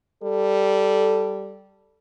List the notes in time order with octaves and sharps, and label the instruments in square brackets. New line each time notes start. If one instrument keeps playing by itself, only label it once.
[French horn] G3 [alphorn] A4